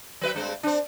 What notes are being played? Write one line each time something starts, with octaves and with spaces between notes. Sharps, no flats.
F#3 B4 E5
G2 G#3 C4
C4 D4